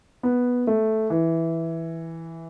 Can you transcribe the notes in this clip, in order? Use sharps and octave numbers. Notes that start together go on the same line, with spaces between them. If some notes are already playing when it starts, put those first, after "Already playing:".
B3
A3
E3